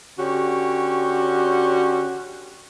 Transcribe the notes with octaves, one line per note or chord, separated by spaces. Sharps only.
D3 C#4 F#4 G4